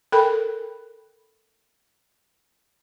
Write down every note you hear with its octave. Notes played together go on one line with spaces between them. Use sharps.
A4 A#4 G5 B5